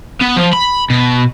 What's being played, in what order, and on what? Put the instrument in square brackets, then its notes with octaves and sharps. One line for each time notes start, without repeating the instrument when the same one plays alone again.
[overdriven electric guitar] B3
F3
B5
B2